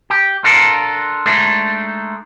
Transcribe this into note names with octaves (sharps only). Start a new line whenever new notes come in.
G4
D4 F4 A4 A#4
G#3 A3 D4 D#4